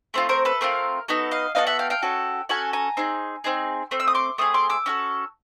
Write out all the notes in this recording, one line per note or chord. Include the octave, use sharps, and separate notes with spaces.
A3 C4 F4
A#4 C5
A4 B4
A3 C4 F4 A#4
B3 D#4 F#4 A4
D#5 F5
B3 D#4 F#4 A4 D#5 F5
E5 F#5
F5 G5
F5 G5
C#4 F#4 A4
C#4 F#4 A4 F#5 G#5
G#5 A#5
C4 D#4 G#4
C4 D#4 G#4
A3 C4
E6
D#6
C6 D6
A3 C4 G#4 D#6
C6 D6
D6 E6
C#4 F#4 A4